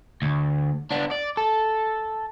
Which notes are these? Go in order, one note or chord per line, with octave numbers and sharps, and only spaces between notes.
D2
B3 D4
D5
A4